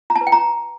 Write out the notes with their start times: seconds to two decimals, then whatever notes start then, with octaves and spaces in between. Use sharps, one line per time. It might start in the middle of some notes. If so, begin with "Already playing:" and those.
0.10 A#5
0.16 A5
0.21 B4
0.27 G5
0.32 A#5